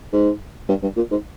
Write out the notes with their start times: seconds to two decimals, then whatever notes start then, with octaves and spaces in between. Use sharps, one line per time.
0.13 G#2
0.69 G2
0.83 G2
0.96 A#2
1.11 G#2